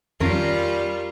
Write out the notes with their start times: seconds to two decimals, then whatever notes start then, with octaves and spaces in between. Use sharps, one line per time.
0.20 F2 D#3 G3 C#4 F4 A#4